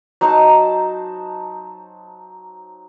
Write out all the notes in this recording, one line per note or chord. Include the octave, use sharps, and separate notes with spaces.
F#3 D#4 C5 A5